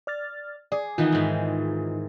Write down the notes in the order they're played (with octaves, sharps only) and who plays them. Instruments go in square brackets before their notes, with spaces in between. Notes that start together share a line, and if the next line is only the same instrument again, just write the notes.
[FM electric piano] D5 F6 A6
[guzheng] G#4 [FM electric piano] D5
[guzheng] D#3 E3 B3 [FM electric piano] D#4 F4
[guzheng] G#2 C4